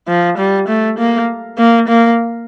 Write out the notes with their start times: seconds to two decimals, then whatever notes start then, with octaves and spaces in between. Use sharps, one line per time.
0.08 F3
0.38 G3
0.68 A3
0.99 A#3
1.58 A#3
1.88 A#3